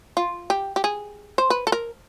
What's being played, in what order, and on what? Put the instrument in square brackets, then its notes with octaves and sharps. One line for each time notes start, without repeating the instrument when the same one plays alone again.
[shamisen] F4
G4
G4
G#4
C5
B4
A4
A#4